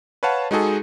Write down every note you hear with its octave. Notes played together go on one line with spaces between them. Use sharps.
B4 C#5 F5 F#5 A5
G#3 D#4 F#4 G#4 A4